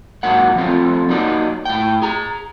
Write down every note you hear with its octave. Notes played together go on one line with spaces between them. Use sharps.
G#2 F#3 A#3 F#5
F3 G3 A3 C4 F4 A4
F#3 A#3 D#4 C5 D5 D#5
A2 G5
G#4 A#5